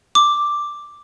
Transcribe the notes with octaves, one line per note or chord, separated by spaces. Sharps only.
D6